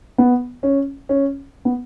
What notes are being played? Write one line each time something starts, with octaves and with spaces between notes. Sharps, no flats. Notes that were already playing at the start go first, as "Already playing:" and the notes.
B3
C#4
C#4
B3